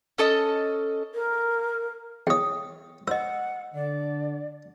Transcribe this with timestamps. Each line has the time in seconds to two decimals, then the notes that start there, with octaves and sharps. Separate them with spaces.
0.18 C#4 A4 D#5
1.15 A#4
2.27 E2 C#5 G5 D#6
3.08 C5 D#5 F#5 E6
3.74 D3 D5